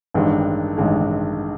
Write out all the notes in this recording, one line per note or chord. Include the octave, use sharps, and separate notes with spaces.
A1 G2 D#3 G#3
A1 G2 D#3 G#3